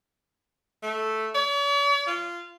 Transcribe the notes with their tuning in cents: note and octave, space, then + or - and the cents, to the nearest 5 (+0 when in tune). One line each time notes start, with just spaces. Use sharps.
A3 -5
C#5 +45
F4 -15